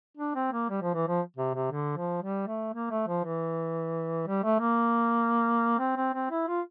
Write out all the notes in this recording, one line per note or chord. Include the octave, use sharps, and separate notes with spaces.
D4
C4
A#3
G3
F3
E3
F3
C3
C3
D3
F3
G3
A3
A#3
A3
F3
E3
G3
A3
A#3
C4
C4
C4
E4
F4